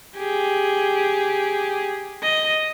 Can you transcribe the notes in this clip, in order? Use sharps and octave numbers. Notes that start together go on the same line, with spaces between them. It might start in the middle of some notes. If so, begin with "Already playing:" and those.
G4 G#4
D#5